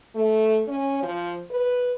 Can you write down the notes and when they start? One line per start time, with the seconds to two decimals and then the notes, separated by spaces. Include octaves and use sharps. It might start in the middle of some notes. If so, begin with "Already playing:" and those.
0.15 A3
0.68 C#4
1.03 F3
1.50 B4